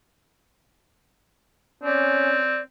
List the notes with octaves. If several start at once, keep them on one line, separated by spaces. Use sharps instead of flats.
C4 C#4 D5